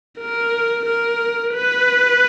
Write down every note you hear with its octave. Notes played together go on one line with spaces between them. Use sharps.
A#4
A#4
B4